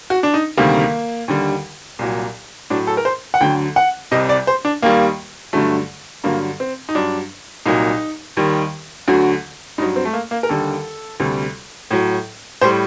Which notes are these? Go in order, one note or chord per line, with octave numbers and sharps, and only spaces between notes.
F#4
D4
D#4
D2 C3 D#3 G3 A#3
D#2 D3 G3
C2 A#2 F#3
A2 F#3 D4
A4
A#4
C5
F#5
D2 D3 F#3 G5
F#5
C2 C3 G3 D#5
D5
C5
D4
D#2 D#3 G3 A#3
G2 D3 F#3 A3
G2 D3 F#3 A#3
C4
D#4
G2 F#3 D4
C2 A#2 F#3 D#4
D#2 D#3 G3
D2 D3 F#3 F#4
G2 F#3 D#4
C4
A3
A#3
A#3
A#4
D#2 D3 G3 A4
D2 C3 G3
A2 F#3
A2 G3 C5